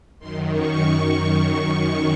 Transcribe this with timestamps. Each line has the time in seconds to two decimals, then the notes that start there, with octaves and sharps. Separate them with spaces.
0.19 F#2 D#3 C6
0.50 C#6